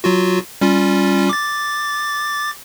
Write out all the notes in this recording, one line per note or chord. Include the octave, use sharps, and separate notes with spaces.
F#3 F4 F#4
G3 C#4 F4
D6 A6